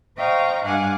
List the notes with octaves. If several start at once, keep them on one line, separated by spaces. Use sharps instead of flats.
C5 D#5 F5 G5 A#5 C#6
G2 F5 F#5 G#5 D6